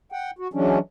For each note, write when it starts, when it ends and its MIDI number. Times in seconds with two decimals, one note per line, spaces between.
0.12 0.31 78
0.12 0.31 79
0.39 0.48 66
0.54 0.79 52
0.54 0.79 54
0.54 0.79 56
0.54 0.79 61
0.54 0.79 62